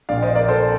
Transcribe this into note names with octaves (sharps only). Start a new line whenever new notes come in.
A#1 A#2 D5 F5
C5 D#5
A#4 D5
A4 C5